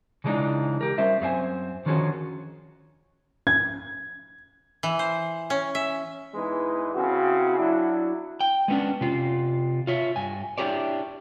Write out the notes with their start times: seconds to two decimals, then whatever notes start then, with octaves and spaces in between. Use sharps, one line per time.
0.24 C#3 E3 G#3 D4 D#4 F4
0.81 G4 A#4
0.98 G3 C#4 F4 C5 E5
1.21 F#2 A3 C4 F4 C5 G#5
1.86 D3 D#3 F3 C#4 F#4 G#4
3.47 G#6
4.83 E3
4.99 C5
5.50 C#4
5.75 E5
6.34 E2 E3 G#3 D#4 B4
6.94 C#3 C4 E4 F#4
7.58 F#3 D4 E4
8.41 G5
8.68 G#3 B3 C#4 D4
9.01 C3 F4
9.87 F4 C#5 E5
10.16 G2 G#5
10.58 D4 E4 F4 G4 C#5 D5